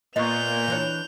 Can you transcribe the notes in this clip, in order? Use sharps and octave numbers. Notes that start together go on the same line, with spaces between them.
A#2 A#3 B3 D#5 C#6 G6 F7
E3 D4 C#5